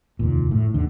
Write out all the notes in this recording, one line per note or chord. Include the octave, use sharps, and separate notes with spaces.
F1 D#2 A#2
A2
D#2 D3